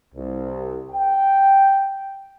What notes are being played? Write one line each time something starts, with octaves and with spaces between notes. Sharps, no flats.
C2
G5